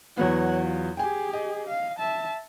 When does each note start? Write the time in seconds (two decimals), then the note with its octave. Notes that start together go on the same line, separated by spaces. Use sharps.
0.17 E2 F#3 B3 C#5 F#5
0.63 F4
0.97 G4 G#4 G5 G#5
1.33 D#5
1.67 F5
1.99 E5 A5